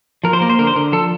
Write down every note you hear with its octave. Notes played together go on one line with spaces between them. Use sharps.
F3 A#4
C5
A#3 A#4
C5
D3 A#4
C5
D3 A#4
F3 A4